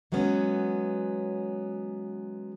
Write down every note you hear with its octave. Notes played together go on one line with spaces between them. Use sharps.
E3 F#3 G#3 B3 C#4